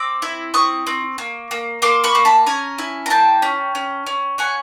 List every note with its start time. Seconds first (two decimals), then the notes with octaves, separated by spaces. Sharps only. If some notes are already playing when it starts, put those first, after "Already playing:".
Already playing: C4 D6 E6
0.22 E4
0.54 C4 C#6 D#6
0.87 C4
1.18 A#3
1.51 A#3
1.82 A#3 C6 D6
2.04 B5 C#6
2.15 A#3
2.25 A5 B5
2.46 C#4 G#5 A#5
2.78 E4
3.06 A#5
3.10 A#3 G5 A5
3.42 C#4
3.75 C#4
4.07 C#4
4.38 C#4 F#5 G#5